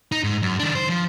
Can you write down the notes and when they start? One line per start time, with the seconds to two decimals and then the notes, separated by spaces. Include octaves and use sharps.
0.12 D#4
0.24 G#2
0.43 F#2
0.59 D#3 D4
0.75 C5
0.89 F3